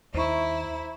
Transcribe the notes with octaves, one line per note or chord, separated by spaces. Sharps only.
D#2 E4 C5 A#5 C#6